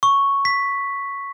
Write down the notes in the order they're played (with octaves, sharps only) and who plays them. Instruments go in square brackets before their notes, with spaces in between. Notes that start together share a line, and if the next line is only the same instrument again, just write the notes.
[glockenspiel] C#6
B6